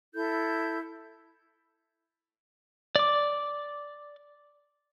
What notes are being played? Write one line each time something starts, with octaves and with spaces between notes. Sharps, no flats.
E4 A4 G6
D5 D6